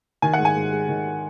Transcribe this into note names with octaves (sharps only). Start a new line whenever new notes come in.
D#3 G#5
F#5
G#2
G#5
G#2
G#3
D#3